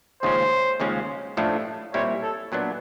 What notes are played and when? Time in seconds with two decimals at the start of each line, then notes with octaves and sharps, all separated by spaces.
0.22 D#2 C#3 F3 G#3 C#4 C5
0.80 D#2 C#3 F3 G#3 C#4
1.37 A2 F3 A3 D4
1.94 A#2 G3 C4 E4 C#5
2.22 A4
2.52 A#2 F#3 B3 D4